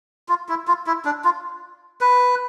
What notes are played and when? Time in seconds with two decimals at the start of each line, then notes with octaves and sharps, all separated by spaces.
0.29 F4
0.49 E4
0.68 F4
0.87 E4
1.05 D4
1.24 F4
2.01 B4